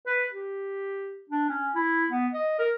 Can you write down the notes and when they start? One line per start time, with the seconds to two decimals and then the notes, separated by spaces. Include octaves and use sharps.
0.07 B4
0.32 G4
1.30 D4
1.49 C#4
1.75 E4
2.10 B3
2.33 D#5
2.59 A#4